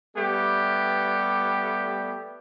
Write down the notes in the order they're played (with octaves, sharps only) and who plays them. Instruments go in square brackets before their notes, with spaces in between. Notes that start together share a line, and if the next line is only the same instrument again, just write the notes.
[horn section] G3 A3 B3 G4